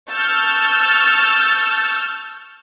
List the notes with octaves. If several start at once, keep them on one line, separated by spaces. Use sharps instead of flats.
A5 C#6 E6 F6 G6 A6